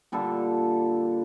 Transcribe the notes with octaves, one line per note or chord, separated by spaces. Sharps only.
A#2 D3 G3 A4